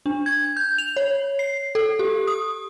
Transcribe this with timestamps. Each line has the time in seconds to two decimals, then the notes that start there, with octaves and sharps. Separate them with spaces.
0.06 D4
0.26 G#6
0.57 G6
0.78 F7
0.97 C#5
1.39 C7
1.75 A4
1.99 G4
2.27 D#6